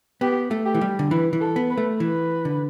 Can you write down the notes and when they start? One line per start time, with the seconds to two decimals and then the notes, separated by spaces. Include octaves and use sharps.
0.21 B3 G4
0.51 A3
0.66 G4
0.74 E3
0.81 G3
0.99 D3
1.11 E3 B4
1.33 E3
1.41 A4
1.56 B3
1.70 B4
1.78 A3
2.00 E3 B4
2.45 D3